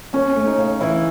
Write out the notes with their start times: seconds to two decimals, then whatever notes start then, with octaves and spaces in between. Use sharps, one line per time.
0.13 D#2 C#4
0.36 A3
0.47 D#4
0.58 C#3
0.81 E3 E4